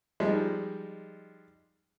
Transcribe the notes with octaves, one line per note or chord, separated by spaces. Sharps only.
F3 G3 G#3 D#4